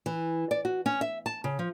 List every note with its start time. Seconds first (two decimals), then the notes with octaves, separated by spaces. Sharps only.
0.06 E3
0.51 D5
0.65 F#4
0.86 C#4
1.01 E5
1.26 A5
1.44 C#3
1.59 F3